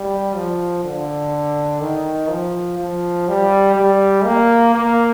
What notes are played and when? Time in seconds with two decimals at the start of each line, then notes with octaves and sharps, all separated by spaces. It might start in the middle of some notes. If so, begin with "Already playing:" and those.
Already playing: G3
0.36 F3
0.84 D3
1.81 D#3
2.30 F3
2.79 F3
3.28 G3
3.76 G3
4.25 A#3
4.74 A#3